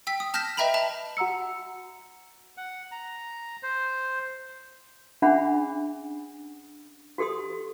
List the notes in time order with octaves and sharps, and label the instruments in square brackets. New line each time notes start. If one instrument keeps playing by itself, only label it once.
[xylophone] G5 E6 B6
D#6
A5 F6 G6 A#6 B6 E7
B4 D#5 E5 G5 A#5 B5
E5 A5 F7
[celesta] F#4 F#5 A#5 E6 C#7
[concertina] F#5
A#5
C5
[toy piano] C#4 D4 G#4 E5 F#5 B5
F#4 G4 A4 C6 D#6